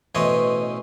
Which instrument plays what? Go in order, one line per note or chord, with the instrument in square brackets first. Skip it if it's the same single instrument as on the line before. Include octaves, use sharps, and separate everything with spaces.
[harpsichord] A1 B2 E3 C5 C#5 D#5